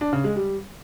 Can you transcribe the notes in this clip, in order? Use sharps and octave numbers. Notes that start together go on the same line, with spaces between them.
D4
C#3
G#3
G3